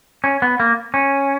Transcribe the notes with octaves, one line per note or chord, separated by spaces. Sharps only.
C#4
B3
A#3
C#4